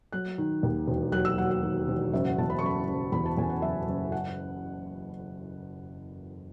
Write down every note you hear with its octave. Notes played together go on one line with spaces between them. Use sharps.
F#3 F#6
D#3
D#2
E1
F#3 F#6
E6
F#3 F#5
F#5
D#3
E1
F#1 E5
F#5
E2 A5
B5
C#6
F#1 B5
F#1
E2 B5
A5
E2 G#5
F#5
F#1 E5
F#1
F#5